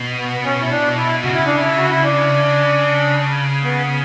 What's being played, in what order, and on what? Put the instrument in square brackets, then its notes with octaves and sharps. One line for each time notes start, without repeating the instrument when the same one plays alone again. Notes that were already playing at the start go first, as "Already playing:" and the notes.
Already playing: [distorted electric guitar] B2
[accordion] B3
B3
C#4
E4
D4
E4
[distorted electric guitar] C#3 [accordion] F#4
[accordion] E4
D4
E4
F#4
E4
D4
B3